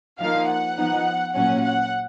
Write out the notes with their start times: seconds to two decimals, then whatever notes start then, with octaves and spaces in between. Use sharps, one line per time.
0.20 F3 A#3 D#4 F5
0.49 F#5
0.77 F3 B3 D#4
1.34 A#2 F#3 C#4 F#5
1.61 F#5